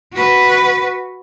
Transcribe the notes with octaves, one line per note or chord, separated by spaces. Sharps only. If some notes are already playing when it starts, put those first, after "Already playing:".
F#4 B4